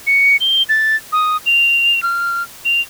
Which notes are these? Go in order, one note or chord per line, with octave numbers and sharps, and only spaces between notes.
C#7
G7
A6
D#6
F7
F6
F7